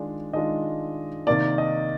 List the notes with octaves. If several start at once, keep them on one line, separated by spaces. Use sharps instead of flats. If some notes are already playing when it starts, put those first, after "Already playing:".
Already playing: D#3 G#3 D4 F4
D#3 G#3 D4 F4 D#5
C3 D#3 A#3 D5
D#5